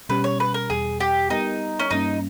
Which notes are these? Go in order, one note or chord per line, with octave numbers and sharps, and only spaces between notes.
B2 G3 C#4 G4 B4
C#5
B4
A#4
E2 B2 G3 G#4
G4
G3 B3 D#4 G4 A#4
C#4
G2 G3 A#3 C#4 D#4